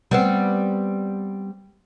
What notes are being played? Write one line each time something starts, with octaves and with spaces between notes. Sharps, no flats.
G3 B3 C4